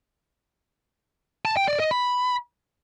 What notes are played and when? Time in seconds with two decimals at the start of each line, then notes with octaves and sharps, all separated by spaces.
1.45 A5
1.57 G5
1.68 D5
1.80 D#5
1.91 B5